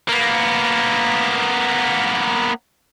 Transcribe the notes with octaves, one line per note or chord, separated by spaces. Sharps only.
A#3 B3